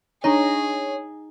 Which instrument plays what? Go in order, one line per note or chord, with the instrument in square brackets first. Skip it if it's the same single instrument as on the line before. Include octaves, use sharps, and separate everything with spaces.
[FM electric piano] D4 C#5 [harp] D#4 A#5 [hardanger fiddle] G#4